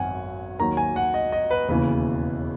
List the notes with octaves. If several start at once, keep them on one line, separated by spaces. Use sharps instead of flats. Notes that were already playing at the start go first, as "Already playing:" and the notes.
Already playing: G#1 F#2 D#3 F#5 G#5
D#2 D#3 F#3 A#5
G#5
F#5
D#5
D#5
B4
E1 D#2 C#3 E3 B4